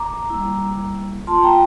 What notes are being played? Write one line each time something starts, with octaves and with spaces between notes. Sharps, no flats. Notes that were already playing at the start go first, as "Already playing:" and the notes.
Already playing: A#5 D6
G3 A#3 E4
A#3 F4 A5 C6
G5 A#5